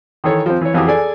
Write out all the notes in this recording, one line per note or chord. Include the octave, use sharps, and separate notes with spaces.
D#3 E3 A4 C#5
F3 C4
E3 C#5
F2 E3 F#4 G4 D#6
G#4 A4 D5 G#5